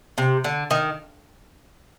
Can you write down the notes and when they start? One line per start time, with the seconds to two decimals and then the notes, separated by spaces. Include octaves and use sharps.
0.18 C3
0.44 D3
0.71 D#3